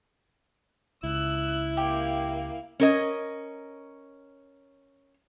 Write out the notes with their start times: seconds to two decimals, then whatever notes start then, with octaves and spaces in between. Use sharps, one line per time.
1.04 C#2 E4 E6 F#6
1.77 A#3 G4 F5
2.80 C#4 A#4 D#5